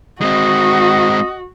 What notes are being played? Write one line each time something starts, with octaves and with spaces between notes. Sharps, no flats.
G#3 C4 F#4 D#5